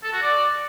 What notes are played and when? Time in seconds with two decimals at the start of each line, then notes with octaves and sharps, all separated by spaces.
0.03 A4
0.12 F#4
0.22 D5